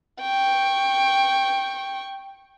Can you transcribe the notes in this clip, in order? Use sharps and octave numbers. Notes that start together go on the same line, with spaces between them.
G5 C#6